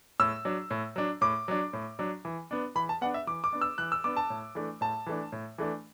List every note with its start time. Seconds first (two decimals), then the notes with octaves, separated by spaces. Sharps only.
0.20 A2 E6
0.45 F#3 D4
0.71 A2
0.96 F#3 D4
1.21 A2 D6
1.48 F#3 D4
1.73 A2
1.99 F#3 D4
2.25 E3
2.51 B3 D4
2.75 E3 B5
2.89 A5
3.01 B3 D4 F#5
3.14 E5
3.27 E3 D6
3.44 D6
3.53 B3 D4
3.61 E6
3.78 E3 F#6
3.92 E6
4.04 B3 D4 D6
4.17 A5
4.30 A2
4.55 E3 A3 D4
4.81 A2 A5
5.07 E3 A3 D4
5.32 A2
5.58 E3 A3 D4